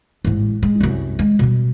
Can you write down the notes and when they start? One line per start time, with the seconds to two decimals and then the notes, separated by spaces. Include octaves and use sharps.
0.25 A1 G#2
0.63 G#3
0.80 C2 F#2
1.19 G#3
1.39 B2 G3